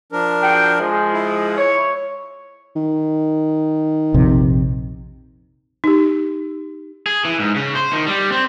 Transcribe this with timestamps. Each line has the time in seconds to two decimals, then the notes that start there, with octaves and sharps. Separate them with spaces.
0.12 F3 D4 A#4
0.42 F#4 G#4 G5
0.79 F3 G#3
1.13 E4
1.58 C#5
2.76 D#3
4.14 A#1 F2 C3
5.84 D#4 G4
7.06 G#4
7.25 E3
7.40 G#2
7.56 C#3
7.75 C5
7.93 D#3
8.07 G3
8.32 C4